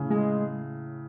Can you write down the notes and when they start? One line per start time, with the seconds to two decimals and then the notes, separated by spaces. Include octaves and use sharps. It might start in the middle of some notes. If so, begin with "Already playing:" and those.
Already playing: A2 C#3
0.10 G#3